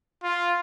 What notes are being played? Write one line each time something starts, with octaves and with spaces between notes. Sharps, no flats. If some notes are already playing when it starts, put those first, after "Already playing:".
F4